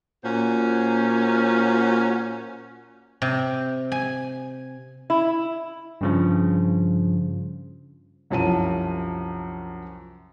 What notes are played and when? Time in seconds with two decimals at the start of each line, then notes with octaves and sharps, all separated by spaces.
0.24 A#2 C#4 F#4 C5
3.22 C3
3.92 G#5
5.10 E4
6.01 G2 C#3 F3
8.30 C2 F#2 F3 A5 D#7